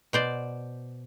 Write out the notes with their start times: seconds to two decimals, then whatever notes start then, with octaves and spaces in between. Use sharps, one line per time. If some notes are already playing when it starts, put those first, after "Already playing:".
0.13 B2 C5 D5